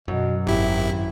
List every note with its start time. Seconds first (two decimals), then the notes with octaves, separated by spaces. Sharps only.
0.08 F#2 B2 F#3
0.47 G#1 E4 G4